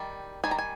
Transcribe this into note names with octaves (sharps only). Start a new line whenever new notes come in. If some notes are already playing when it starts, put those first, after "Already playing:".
Already playing: D#3 G3
D#3 G3 G#5
A#5
G#5